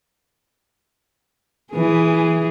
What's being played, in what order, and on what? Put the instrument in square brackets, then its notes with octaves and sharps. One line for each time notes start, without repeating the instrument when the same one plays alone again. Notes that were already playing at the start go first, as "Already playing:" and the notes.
[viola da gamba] E3 G#4